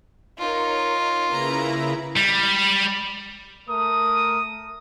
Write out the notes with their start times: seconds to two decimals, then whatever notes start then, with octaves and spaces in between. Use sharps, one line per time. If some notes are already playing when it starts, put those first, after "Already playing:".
0.39 D#4 F4 A#4 C#5
1.30 C#3 A#3 E4 B4 A#5
2.17 G3
3.68 A3 A#4 D#6